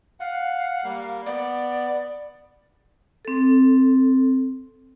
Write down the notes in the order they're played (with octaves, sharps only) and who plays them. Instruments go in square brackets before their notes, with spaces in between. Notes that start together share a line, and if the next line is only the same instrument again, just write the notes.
[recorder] F5 [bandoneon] F#5
[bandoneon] G3 A#3
[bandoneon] B3 [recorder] D5
[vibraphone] C4 A4